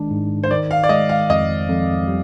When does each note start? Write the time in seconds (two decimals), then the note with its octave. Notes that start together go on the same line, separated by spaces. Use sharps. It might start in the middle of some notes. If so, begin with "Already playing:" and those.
Already playing: D#3 G#3 D4
0.11 G#2
0.43 C5
0.51 D#3 D5
0.71 F5
0.83 D5
0.89 G#3 D#5
1.09 F5
1.30 F2 D#5
1.69 F2
2.08 G3